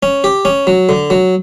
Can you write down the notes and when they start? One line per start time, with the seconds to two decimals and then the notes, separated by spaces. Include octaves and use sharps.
0.03 C#4
0.24 G4
0.45 C#4
0.67 F#3
0.89 D3
1.10 F#3